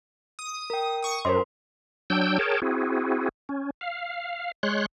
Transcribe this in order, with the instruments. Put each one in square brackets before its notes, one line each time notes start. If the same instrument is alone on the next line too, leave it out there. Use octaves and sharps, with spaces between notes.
[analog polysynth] D#6
[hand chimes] A#4 G5
[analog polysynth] C#6 D#6
[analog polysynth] F#2 [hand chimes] A#4 C5 C6
[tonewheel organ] F#3 D4 G5 E6 G6
G#4 A#4 C#5 G5 A5
C4 E4 F#4 G#4
C#4
F5
G#3 C#5 C6 F#6